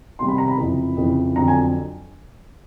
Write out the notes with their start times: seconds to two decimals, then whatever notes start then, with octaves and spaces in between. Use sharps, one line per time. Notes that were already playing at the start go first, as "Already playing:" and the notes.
0.19 C3 D#3 G3 C4 C6
0.28 B5
0.38 A#5
0.48 B5
0.58 F2 C#3 E3
0.97 F2 C#3 E3
1.35 F2 D3 F#3 A#5
1.48 G#5